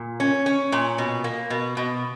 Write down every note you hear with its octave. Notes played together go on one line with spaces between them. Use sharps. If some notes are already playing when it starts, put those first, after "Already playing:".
Already playing: A#2
C#4
C#4
A#2
B2
A#3
B2
B2